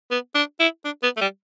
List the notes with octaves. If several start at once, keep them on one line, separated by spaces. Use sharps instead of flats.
B3
D4
E4
D4
B3
A3
G3